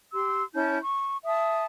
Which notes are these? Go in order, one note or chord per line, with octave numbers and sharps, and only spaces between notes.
G4 C6 E6
C#4 E4 A5 G6
C#6
E5 A5 D#6